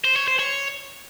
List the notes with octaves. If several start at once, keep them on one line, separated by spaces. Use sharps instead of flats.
C5
C#5
C5
C#5